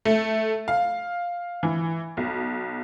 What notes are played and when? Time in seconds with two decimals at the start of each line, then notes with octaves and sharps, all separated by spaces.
0.05 A3
0.68 F5
1.63 E3
2.17 B1